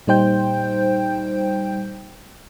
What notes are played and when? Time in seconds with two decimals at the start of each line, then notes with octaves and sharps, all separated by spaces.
0.07 A#2 G3 D#4 C5 G5 G6